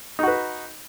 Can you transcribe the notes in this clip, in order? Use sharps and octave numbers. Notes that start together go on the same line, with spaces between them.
D#4 F#4 B4